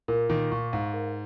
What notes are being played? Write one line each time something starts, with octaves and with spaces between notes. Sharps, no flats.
A#2 A#4
A#2 D#3 A#4
A#2 C#6
G#2 F5
A#4